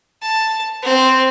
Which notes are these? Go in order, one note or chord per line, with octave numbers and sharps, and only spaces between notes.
A5
C4